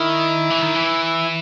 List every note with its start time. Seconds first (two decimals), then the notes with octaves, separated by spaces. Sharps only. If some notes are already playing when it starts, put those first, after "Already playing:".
Already playing: D#3 E4
0.50 E3
0.62 D#3
0.75 E3